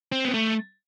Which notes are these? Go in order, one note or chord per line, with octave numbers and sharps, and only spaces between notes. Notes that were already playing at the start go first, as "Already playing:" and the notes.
C4
B3
A3